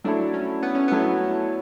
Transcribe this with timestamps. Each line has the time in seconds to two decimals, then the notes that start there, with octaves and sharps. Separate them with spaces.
0.04 F#3 A3 D4 E4 A4
0.34 C#4
0.63 B3
0.75 C#4
0.88 F#3 A3 B3 E4 A4